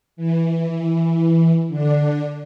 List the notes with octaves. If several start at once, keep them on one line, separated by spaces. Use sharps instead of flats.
E3
D3 D4